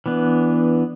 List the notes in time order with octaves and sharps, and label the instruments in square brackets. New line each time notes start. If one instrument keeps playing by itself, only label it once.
[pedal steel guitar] E3 B3 D4